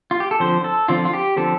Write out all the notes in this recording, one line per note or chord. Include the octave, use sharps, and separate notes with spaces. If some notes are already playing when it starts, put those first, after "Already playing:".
F4
G4
A4
D3 F3 C4 C5
A4
D3 F3 C4 F4
F4
G4
D3 F3 C4 A4